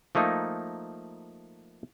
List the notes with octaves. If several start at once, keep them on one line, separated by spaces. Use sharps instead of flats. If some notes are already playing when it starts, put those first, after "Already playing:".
F3 A3 A#3 D#4